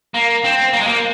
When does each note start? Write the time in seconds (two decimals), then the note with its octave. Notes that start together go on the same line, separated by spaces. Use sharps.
0.14 A#3
0.44 C4
0.73 A#3
0.80 G#3
0.87 A#3